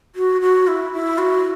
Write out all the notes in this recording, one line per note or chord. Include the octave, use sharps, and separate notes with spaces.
F#4
F#4
E4
E4
F#4